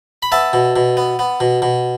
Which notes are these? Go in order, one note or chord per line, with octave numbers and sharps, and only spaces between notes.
B5
B3 E5 A5
B2
B2
B3
B3
B2
B2